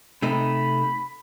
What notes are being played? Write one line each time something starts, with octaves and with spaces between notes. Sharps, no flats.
C3 A3 D#4 B5